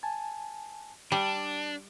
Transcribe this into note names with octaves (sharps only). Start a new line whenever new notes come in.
G#5 A5
G3 D4 A5